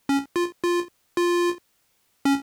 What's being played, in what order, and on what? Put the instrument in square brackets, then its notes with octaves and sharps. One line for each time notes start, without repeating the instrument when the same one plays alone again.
[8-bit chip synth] C#4
F4
F4
F4
C#4